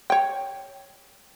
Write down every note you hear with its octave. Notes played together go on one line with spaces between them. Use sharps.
C#5 G5